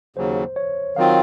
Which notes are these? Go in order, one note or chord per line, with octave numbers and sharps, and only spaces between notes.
D#2 C#3 F#3 C5
C#5
D#3 F#3 C4 F4 F5